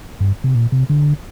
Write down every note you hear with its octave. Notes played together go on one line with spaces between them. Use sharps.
G2
C3
A#2
C3
D3